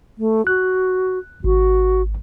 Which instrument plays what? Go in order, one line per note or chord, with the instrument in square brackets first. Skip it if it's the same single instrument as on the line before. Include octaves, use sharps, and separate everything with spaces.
[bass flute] A3
[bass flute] F#4 [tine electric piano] F#6
[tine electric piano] G#1 [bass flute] F#4